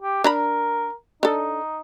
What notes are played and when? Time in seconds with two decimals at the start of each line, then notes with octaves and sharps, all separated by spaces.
0.02 G4
0.24 D4 A#4 A#5 B5
1.23 D4 D#4 A4